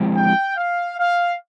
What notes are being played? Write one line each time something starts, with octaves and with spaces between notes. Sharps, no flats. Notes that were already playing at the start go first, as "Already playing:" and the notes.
Already playing: F3 G#3 C4 E4 G4
G5
F5
F5